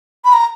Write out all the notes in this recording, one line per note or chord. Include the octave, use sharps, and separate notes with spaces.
B5
A#5